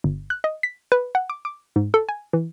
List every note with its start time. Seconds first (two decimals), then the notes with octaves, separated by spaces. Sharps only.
0.04 G1
0.30 F#6
0.44 D#5
0.63 B6
0.92 B4
1.15 F#5
1.30 D6
1.45 D6
1.76 G#2
1.94 A4
2.09 G#5
2.33 E3